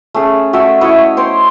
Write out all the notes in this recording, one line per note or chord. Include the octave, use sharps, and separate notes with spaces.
A3 C#4 G#4
A3 F#4 E5 G5
E4 F#4 C#5 D#5
C5 C#5 G5 C6